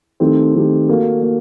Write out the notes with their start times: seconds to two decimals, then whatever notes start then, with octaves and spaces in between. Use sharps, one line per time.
0.20 D#3 A3 C4 G4
0.55 D#3 A3 C4 G4
0.89 A#3 F#4 A4
1.22 A#3